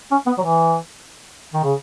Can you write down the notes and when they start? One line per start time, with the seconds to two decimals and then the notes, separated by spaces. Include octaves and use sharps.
0.11 C#4
0.26 B3
0.38 F#3
0.42 E3
1.54 D#3
1.63 C#3